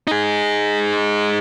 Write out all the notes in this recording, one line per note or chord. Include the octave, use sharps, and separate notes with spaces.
D#4 G#4